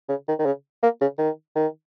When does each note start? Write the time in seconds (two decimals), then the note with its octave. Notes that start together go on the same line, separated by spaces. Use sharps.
0.09 C#3
0.28 D#3
0.39 D#3
0.46 C#3
0.83 A#3
1.01 C#3
1.18 D#3
1.56 D#3